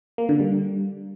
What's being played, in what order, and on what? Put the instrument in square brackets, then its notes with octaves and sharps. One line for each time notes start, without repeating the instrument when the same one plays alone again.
[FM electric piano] A#3
D3
G3